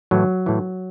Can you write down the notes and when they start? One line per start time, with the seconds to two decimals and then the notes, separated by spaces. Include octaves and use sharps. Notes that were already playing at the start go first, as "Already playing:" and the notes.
0.11 A2 E3 F#3
0.46 A2 E3